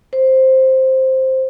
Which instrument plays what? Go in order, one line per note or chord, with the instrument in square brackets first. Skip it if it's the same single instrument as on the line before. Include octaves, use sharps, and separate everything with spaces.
[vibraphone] C5